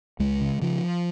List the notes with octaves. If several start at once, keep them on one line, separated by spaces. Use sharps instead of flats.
C#2 G#3
C#3
C#3 F3